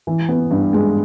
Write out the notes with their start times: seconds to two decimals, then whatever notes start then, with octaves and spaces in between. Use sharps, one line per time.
0.07 E3
0.29 B3
0.51 G2
0.73 G#3